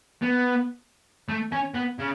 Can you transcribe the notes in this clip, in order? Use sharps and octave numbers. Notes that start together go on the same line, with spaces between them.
B3
A3
C#4
B3
C#3